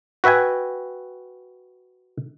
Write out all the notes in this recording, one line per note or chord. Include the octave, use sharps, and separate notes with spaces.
F#4 B4 E5 G5 G#5